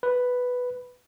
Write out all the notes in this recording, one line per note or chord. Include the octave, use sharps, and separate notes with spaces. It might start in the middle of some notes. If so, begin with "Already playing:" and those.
B4